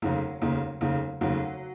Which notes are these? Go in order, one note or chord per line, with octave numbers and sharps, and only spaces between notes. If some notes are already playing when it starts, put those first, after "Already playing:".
F1 D#2 C#3 F#3
F1 D#2 C#3
F1 D#2 C#3
F1 D#2 C#3 F#3